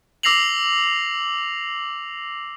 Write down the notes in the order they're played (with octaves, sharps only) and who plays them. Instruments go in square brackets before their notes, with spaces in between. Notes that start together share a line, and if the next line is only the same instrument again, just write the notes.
[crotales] D6 E6 A#6 C7 F7 F#7